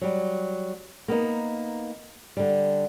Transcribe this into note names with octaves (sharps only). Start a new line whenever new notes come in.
F#3 G3
A#3 B3 D#4
D3 G3